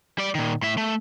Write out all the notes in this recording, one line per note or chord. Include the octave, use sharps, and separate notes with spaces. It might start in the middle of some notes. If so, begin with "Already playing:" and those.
G3 D5
A#2 D#3
A2 E5
A3